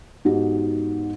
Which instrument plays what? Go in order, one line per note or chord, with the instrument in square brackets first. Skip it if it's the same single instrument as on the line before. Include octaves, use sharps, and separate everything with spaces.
[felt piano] G#2 B3 D#4 F#4 G4